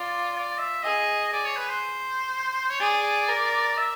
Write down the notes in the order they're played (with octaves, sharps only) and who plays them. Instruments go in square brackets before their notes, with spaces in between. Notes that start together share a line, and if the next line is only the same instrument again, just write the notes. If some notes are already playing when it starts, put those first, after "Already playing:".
Already playing: [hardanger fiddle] F4 [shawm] D5
[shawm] D5
E5
[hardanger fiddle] G#4 [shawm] D#5
[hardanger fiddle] G#4 [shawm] D5
[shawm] C#5
B4
C5
C#5
[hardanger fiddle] G#4 [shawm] D5
[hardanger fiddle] A#4
[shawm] E5